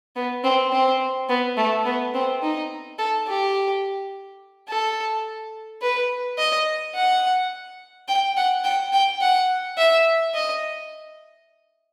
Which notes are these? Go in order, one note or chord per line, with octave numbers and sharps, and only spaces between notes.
B3
C4
C4
B3
A3
B3
C4
D#4
A4
G4
A4
B4
D#5
F#5
G5
F#5
G5
G5
F#5
E5
D#5